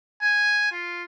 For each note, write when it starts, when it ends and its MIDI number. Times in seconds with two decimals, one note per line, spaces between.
0.22 0.68 80
0.72 1.03 65